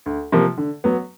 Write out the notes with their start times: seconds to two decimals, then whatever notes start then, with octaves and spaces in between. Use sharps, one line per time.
0.06 D2
0.32 C3 F3 A#3
0.58 D3
0.84 F#3 B3